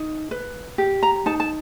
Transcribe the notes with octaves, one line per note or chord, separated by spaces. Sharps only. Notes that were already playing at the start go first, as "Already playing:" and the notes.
Already playing: D#4
B4
G4
A#5
D#4 A5
A5